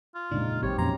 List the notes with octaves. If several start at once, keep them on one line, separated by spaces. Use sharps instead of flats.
F4
F1 A#2 C#3 G#3 D4 D#4
A1 F#3 C4 G4 C#5
F2 A#2 E3 C#4 A#5 C6